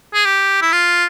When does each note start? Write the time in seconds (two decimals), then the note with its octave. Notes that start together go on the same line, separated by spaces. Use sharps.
0.14 G#4
0.25 G4
0.62 E4
0.72 F4